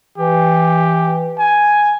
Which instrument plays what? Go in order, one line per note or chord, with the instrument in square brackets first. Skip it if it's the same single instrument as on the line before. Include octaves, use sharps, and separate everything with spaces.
[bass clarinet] E3 [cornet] G4
[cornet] G#5